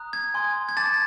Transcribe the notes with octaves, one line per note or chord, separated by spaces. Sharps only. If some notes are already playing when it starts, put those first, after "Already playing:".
Already playing: A#5 D#6 F#6
G#6
G#5 C6 D#6
G#6
A5 D6 G6 A6